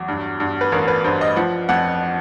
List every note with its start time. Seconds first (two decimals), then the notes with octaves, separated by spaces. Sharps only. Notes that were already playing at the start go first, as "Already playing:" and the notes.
Already playing: E2 F#3
0.08 G2
0.40 G2
0.61 B4
0.72 A1 A#4
0.88 B4
1.04 G2 C5
1.21 D#5
1.36 F3 F#5
1.69 F2 F#5